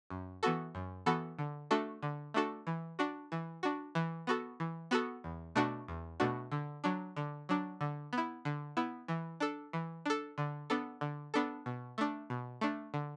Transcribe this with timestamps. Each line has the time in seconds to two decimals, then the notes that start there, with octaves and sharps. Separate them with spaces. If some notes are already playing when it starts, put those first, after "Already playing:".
0.10 F#2
0.43 E3 B3 F#4 A4
0.75 F#2
1.06 E3 B3 F#4 A4
1.39 D3
1.71 A3 D4 F#4 A4
2.03 D3
2.34 A3 D4 F#4 A4
2.67 E3
2.99 D4 F#4
3.32 E3
3.63 D4 F#4
3.95 E3
4.27 B3 F#4 A4
4.60 E3
4.91 B3 F#4 A4
5.24 E2
5.55 B2 A3 D4 F#4
5.88 E2
6.20 B2 A3 D4 F#4
6.52 D3
6.84 F#3 D4
7.17 D3
7.49 F#3 D4
7.81 D3
8.13 B3 E4
8.45 D3
8.77 B3 E4
9.08 E3
9.40 D4 A4
9.73 E3
10.06 D4 A4
10.38 D3
10.70 B3 D4 A4
11.01 D3
11.34 B3 D4 A4
11.66 B2
11.98 A3 D4
12.30 B2
12.61 A3 D4
12.94 D3